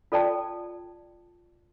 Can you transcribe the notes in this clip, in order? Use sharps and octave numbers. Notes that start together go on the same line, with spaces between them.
F4 A4 D5 G5 A5